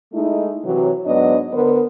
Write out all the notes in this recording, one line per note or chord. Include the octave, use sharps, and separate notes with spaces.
G#3 A3 D#4 E4
C3 E3 F#3
G#2 F#3 B3 D4 D#5
D3 B3 A#4 C5